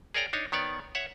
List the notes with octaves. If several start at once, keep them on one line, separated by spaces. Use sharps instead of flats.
G#4 A#4 C#5 D5 G5 A#5
D4 D#4 C#5
D#3 B3 C#5 D5
C#5 E5 F#5